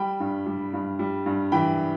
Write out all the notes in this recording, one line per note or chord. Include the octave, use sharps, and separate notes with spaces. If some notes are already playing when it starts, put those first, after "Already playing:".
Already playing: G3 G5 B5
G2
G3
G2
G3
G2
E3 G5 B5